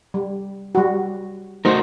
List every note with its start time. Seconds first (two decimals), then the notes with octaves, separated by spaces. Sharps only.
0.14 G3
0.75 G3 F#4
1.65 A3 D#4 F#4 A#4 C5